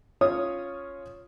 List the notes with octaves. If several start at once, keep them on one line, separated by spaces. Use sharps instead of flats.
C#4 F4 C#5 D#6